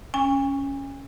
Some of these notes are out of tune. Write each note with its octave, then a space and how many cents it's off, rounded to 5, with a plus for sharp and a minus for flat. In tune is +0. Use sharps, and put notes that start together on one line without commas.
C#4 +0 G#5 -40